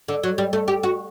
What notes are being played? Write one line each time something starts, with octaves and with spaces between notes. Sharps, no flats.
D3
F#3
G3
A3
G4
F#4